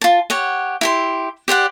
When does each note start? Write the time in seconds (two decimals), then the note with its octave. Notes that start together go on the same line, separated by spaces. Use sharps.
0.01 F4 A5
0.30 G4 C#5 F#5
0.81 E4 G4 C6
1.48 G4 C5 D5 F#5